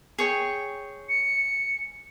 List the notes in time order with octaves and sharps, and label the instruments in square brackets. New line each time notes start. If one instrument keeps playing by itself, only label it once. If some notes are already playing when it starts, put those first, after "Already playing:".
[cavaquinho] G#4 C#5 G5
[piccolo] C#7